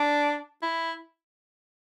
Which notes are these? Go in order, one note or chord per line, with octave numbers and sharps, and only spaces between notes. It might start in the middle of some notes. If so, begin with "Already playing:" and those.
Already playing: D4
E4